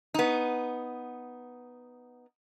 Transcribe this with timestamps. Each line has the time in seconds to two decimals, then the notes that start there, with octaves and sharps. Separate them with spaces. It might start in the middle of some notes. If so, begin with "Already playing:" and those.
0.14 B3 D#4